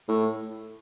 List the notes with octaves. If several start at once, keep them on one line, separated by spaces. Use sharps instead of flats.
A2